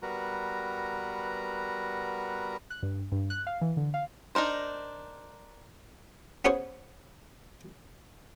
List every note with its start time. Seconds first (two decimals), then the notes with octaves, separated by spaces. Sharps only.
0.02 G3 B3 F#4 A#4 B4 A#5
2.70 F#6
2.83 G2
3.12 G2
3.30 F#6
3.47 F5
3.61 E3
3.77 D3
3.94 F5
4.35 D4 D#4 A#4 C5
6.45 B3 C#4 G#4 C5 C#5